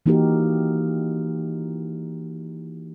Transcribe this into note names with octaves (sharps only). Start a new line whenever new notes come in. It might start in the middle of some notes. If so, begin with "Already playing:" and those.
E3 A#3 D#4 F#4 G4 A#4